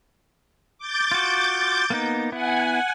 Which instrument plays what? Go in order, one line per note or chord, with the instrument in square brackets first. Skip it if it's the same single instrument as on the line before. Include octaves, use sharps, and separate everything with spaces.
[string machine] D6 G6 A6
[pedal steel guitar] F4 F#4
A#3 B3 D#4
[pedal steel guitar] B3 E4 [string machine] F#5 G#5